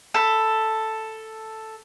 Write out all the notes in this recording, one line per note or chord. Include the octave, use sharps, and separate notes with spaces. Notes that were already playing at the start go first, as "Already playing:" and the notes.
A4 B5